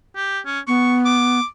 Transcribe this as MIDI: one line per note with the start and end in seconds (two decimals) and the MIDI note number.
0.16 0.39 67
0.46 0.60 61
0.68 1.39 59
0.68 0.97 85
1.05 1.46 86